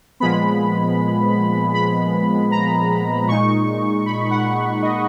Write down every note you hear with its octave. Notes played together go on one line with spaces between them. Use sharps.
A#2 F3 G#3 B3 B5
B5
A#5
A#2 G#3 D#4 C#6
B5
F#5
D#5